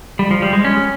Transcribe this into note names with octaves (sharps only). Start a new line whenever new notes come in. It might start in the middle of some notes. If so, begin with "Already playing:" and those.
G3
F3
G3
G#3
C#4